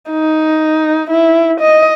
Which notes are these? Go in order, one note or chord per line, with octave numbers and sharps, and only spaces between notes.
D#4
E4
D#5